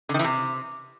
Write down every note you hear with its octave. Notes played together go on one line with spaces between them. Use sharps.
D3
D#3
E3
C3